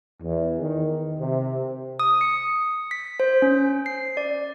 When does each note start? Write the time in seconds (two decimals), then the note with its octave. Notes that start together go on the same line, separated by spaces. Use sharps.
0.21 E2
0.60 D#3
1.19 C3
1.99 D#6
2.21 C#7
2.91 B6
3.20 C5
3.42 C#4
3.86 C7
4.17 D5